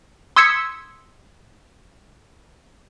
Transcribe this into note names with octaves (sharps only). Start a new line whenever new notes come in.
C6 D#6 E6 G#6 B6 C#7